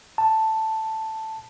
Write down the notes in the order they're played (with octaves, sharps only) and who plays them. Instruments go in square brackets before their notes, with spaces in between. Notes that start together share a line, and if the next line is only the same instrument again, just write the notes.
[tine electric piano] A5